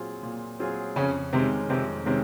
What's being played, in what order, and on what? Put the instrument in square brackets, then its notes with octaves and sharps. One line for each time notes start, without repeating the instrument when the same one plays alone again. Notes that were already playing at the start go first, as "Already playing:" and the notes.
Already playing: [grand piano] A#2 F#3 C4 F4 G#4
A#2
F#3 C4 F4 G#4
[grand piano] F2 [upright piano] C#3 C#4
[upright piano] C3 C4 [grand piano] D#3 G#3 C#4
[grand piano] F2 [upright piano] C3 C4
[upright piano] C3 C4 [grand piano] D#3 G#3 C#4